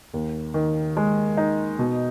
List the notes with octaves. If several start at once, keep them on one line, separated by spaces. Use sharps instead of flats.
D#2
D#3
G#3
D#4
B2